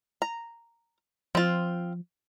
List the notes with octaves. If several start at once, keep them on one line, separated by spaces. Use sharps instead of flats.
A#5
F3 C4 F4